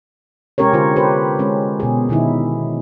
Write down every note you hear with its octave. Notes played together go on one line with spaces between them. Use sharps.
C3 G#3 C#4 G4 A#4 C#5
D3 F4 C5
G4 B4 C5
G#3 C#4
B2 G#4
B2 D#3 D#4 E4